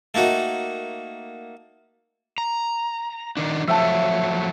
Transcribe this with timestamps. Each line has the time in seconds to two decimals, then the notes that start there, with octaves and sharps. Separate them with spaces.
0.14 A3 A#3 D#4 F#4
2.38 A#5
3.37 D#3 D4
3.68 F3 F#3 A3 E5 G5 A5